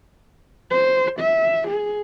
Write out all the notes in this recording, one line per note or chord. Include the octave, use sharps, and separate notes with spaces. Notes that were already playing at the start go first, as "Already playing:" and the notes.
C5
E5
G#4